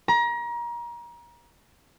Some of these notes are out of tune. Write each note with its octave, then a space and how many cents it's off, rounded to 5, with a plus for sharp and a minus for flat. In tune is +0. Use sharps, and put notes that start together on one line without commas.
A#5 +30